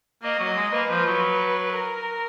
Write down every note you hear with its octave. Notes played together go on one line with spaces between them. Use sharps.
A#3 D#5
F#3
G#3
A#3 B4
F3
F#3
A#4